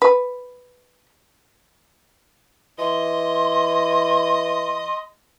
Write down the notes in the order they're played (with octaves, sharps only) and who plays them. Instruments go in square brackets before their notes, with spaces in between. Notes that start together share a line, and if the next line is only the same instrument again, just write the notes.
[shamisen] B4
[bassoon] E3 [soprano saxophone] D#5 [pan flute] C6